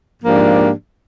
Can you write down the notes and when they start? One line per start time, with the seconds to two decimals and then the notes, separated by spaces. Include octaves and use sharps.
0.22 G#2 F3 A#3 D4 G4